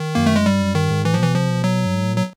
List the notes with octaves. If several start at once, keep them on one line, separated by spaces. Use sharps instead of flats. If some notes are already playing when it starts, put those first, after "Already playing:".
Already playing: D#3
F#2 A#3
A3
G#3
G2 G3
F#2
G2 D#3
G#2
A2 E3
F3
B2 E3
C3 F3
B2
F#3
G2
G#2
A2
A#2 F#3